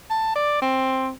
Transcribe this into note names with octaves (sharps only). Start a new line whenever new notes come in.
A5
D5
C4